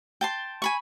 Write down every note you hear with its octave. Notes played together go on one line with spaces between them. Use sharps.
G5 A5 C6
G#5 B5 C#6